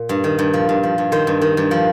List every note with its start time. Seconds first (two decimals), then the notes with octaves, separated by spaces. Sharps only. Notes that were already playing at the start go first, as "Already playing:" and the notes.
Already playing: A#2
0.09 G2
0.24 D#3
0.39 G2
0.54 F3
0.69 G2
0.83 F3
0.98 G2
1.12 D#3 C5
1.27 G2
1.41 D#3
1.57 G2
1.71 F3